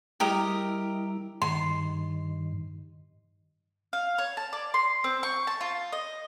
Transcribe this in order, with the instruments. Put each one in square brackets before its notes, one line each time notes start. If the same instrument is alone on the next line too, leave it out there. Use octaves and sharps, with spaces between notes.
[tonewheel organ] G3 E4 [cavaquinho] G4 A#4 D#5
[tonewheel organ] G2 D#3 [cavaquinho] C6
[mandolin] F5
C#5
A5
D5
C6
C4
C#6
A5
F4
D#5